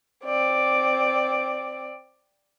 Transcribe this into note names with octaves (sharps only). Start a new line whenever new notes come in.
C4 D5